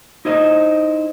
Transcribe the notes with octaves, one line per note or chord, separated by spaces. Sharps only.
D#4 E4 C5 D#5